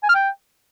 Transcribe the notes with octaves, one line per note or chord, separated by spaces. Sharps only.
G#5
F6
G5